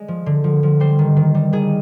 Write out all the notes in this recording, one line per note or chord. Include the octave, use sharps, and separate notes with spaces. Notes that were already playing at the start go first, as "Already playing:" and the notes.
Already playing: G#3 D5
F3
D3
F3
F3
G3 C5
D#3
D#3
G3
D#3 G#4